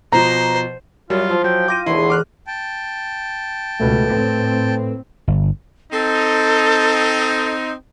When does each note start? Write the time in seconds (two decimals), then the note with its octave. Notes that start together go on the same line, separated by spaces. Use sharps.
0.12 B2 F3 C5 A#5
1.10 F#2 F#3 G3 F4
1.30 F3 E4
1.44 F#3 G5
1.68 F4 D6 A#6 D#7
1.86 D#2 B2 D3 E3 G#3 E4 C6
2.10 D6 F6 F#6
2.47 G5 A5
3.80 C#2 B2 A3 A4 B4
4.09 A2 C4
5.28 G1
5.92 C4 D#4 A4